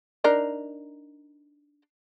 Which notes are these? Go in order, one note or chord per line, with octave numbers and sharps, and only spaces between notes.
D4 D#4 A#4